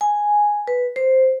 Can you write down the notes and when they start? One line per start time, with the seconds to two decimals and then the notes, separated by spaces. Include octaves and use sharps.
0.01 G#5
0.68 B4
0.96 C5